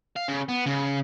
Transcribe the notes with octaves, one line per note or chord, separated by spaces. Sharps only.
F5
C#3
B3
C#3